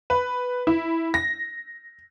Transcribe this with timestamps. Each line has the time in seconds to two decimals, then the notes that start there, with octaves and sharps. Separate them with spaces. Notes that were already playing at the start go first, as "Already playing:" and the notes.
0.10 B4
0.67 E4
1.14 A#6